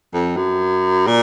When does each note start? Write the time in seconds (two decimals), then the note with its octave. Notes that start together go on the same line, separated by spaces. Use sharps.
0.14 F2
0.37 F#2
1.07 A#2